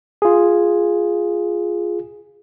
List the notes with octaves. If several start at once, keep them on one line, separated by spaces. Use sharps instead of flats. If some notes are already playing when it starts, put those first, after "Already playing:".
F4 G#4